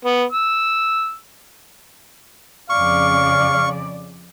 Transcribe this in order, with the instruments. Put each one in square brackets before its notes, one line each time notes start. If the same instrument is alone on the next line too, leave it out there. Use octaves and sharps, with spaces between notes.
[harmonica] B3
E6
[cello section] F2 C#3 D5 [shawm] F5 [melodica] C#6